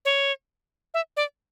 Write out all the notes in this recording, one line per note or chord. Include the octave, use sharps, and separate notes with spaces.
C#5
E5
D5